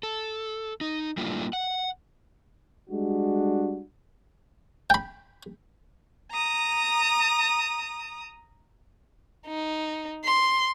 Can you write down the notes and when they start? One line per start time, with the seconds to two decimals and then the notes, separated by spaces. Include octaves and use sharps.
0.03 A4
0.81 D#4
1.17 G3 A3 A#3 D4 E4 F4
1.53 F#5
2.89 G3 G#3 D4 F#4
4.90 G5 B5
6.32 A#5 D#6
9.47 D#4
10.25 C6